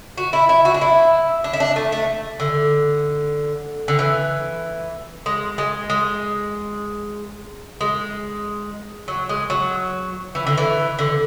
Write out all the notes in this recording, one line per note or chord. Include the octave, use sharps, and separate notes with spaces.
F#4
E4
E4
F#4
D4
E4
D4
E4
D4
A3
A3
D3
D3
E3
G#3
G#3
G#3
G#3
F#3
G#3
F#3
E3
D3
E3
D3